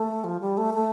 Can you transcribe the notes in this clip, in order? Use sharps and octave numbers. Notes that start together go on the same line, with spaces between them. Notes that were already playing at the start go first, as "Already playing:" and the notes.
Already playing: A3
F3
G3
A3
A3